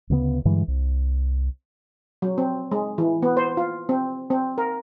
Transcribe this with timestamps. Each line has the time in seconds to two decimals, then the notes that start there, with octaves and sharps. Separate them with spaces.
0.10 D2 C#3 G3 B3
0.45 G2 D3 E3 G#3
0.68 C2
2.22 F#3
2.38 C4
2.71 G#3
2.98 E3
3.22 B3
3.37 C5
3.57 F4
3.89 C4
4.30 C4
4.58 A#4